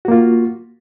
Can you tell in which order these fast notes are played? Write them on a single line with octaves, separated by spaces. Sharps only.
F#4 A#3 F4